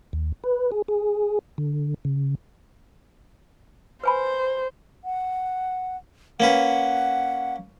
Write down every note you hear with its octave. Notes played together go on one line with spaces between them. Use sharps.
D#2
B4
G#4
G#4
D3
C#3
B4 C5 G#5 B5
F#5
A#3 C#4 B4 F#5